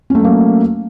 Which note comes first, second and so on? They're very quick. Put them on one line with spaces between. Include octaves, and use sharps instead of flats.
C#4 A3 F#3 A#3